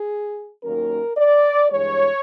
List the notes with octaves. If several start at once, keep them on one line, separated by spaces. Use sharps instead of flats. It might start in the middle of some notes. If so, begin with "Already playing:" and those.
Already playing: G#4
D#2 D#3 F#3 A#3 C#4 A#4
D5
G2 E3 G#3 C#5